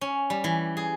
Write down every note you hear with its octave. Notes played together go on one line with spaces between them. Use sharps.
C#4
G3
E3
G#4